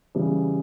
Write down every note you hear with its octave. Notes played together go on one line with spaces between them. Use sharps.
C#3 E3 G3